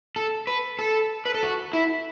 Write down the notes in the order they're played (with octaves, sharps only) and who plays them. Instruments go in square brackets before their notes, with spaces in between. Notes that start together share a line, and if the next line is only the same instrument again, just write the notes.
[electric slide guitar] A4
B4
A4
B4
A4
F#4
E4